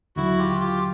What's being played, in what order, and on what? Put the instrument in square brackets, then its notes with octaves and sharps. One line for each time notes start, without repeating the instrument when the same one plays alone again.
[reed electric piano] D#2 D3 F#3 [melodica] E4 F#4
[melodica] F4 G4
F4 G4